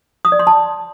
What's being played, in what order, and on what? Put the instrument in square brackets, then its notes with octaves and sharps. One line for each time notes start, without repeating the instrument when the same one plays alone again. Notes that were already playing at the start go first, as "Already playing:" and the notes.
[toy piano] D#6
D5
C6
A5